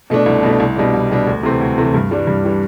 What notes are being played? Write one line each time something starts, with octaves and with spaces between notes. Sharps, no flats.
B2 A3 D4
C2
B2 A3 D4
C2
B2 G3 D4
C2
B2 G3 D4
D2
C3 E3 A3 C4
D2
C3 E3 A3 C4
G2
E3 G3 D4
G2
E3 G3 D4